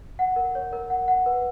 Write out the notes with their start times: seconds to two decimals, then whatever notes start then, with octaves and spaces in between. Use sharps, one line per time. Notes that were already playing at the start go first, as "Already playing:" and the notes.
0.19 F#5
0.36 A#4
0.55 C#5
0.73 A#4
0.90 F#5
1.08 F#5
1.26 B4